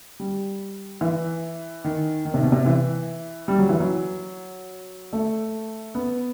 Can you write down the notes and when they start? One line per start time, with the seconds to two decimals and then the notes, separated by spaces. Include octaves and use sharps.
0.20 G3
1.01 E3
1.84 D#3
2.25 D#3
2.34 C3
2.43 B2
2.52 C3
2.66 E3
3.48 G3
3.59 F#3
3.69 E3
3.80 F#3
5.13 A3
5.95 B3